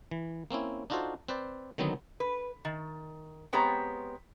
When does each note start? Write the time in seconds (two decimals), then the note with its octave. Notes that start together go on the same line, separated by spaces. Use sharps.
0.11 E3
0.51 A#3 C4 C#4 E4
0.90 D4 D#4 F4 F#4 A4 C5
1.28 C4 B4 C5 D5
1.78 D3 D#3 F#3 B3 C4 D#4
2.20 B4
2.65 D#3
3.53 G#3 B3 C4 G4 C#5 A#5